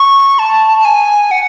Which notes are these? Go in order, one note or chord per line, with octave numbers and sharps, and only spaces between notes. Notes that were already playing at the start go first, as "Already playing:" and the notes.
Already playing: C#6
A5
A5
G#5
F#5